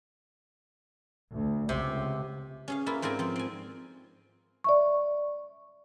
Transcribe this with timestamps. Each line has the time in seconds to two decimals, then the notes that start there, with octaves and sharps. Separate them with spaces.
1.32 D2
1.69 C#2 C3
2.68 C#4 G#4 F5
2.86 A#3 E4 F4
3.02 G#2 C4 A#4 D5 G#5
3.19 F3 C4
3.36 C4 G#5
4.64 D5 E5 C#6